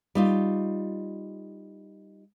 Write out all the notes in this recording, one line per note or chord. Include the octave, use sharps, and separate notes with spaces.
G3 D#4 F4